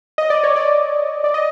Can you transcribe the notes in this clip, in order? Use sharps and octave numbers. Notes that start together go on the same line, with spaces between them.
D#5
D5
C#5
D5
D5
D#5